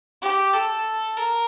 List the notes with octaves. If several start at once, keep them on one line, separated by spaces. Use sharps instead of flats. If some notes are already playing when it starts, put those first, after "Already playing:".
G4
A4
A#4